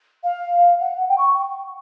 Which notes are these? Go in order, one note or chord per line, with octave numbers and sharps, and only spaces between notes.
F5
F#5
G5
C#6